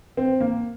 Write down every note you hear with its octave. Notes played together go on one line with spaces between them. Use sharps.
C4
A#3